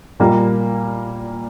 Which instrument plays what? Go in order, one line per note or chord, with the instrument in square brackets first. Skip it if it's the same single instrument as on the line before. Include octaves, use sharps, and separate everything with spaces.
[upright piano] A#2 G3 A#3